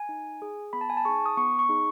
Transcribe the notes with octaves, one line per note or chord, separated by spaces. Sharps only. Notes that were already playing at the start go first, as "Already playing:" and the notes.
Already playing: G#5
D#4
G#4
B3 B5
A5
G#5
A5
D#4 G#4 C#6
D#6
B3 C#6
C#6
D#4 G#4